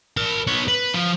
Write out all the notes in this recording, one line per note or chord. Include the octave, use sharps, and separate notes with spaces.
A#4 A5
B3 C#5
B4
F3